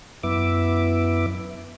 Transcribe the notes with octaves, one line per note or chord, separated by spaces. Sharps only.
F#2 B3 E4 E5 D6